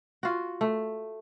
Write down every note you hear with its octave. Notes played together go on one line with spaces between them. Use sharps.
F4 F#4
A3